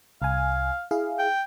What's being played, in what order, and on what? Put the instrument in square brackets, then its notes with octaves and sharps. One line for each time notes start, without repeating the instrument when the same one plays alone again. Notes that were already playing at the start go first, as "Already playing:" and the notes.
[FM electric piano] C2 G#5 [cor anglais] F5
[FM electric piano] E4 G#4 F5
[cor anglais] G5